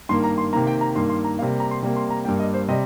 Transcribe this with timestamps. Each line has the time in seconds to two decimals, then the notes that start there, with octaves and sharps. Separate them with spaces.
0.09 G2 D#3 A#3 C6
0.24 A#5
0.38 C6
0.53 C3 D#3 A#3 A#5
0.67 G5
0.81 A#5
0.95 G2 D#3 A#3 C6
1.10 C6
1.25 A#5
1.39 C3 G3 A#3 F5
1.60 A#5
1.71 C6
1.83 C3 G3 A#3
1.96 C6
2.11 A#5
2.25 G2 G3 A#3 G5
2.40 D#5
2.54 C5
2.68 C3 G3 D#5